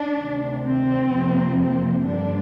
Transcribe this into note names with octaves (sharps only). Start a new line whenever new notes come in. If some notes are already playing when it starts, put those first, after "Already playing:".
Already playing: D4
D2 C3 D#3
C4
F2 C3 F3 A#3
C4
G2 D3 G3 A#3 D4